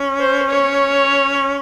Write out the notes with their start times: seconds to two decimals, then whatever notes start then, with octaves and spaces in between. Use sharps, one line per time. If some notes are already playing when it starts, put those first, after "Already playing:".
Already playing: C#4
0.20 C5
0.50 C#5